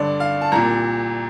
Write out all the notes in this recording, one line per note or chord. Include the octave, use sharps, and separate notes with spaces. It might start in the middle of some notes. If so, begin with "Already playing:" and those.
Already playing: G2 D3 D5
F5
A5
C2 A#2 A#5